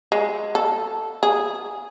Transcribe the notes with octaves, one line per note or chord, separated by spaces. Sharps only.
G#3
A4
G#4